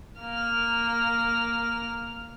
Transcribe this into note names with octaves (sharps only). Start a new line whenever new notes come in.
A#3 F6